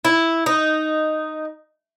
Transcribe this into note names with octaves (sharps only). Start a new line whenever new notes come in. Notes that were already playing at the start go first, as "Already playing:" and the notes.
E4
D#4